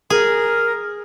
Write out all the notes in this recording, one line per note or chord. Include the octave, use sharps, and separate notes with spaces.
G#4 A#4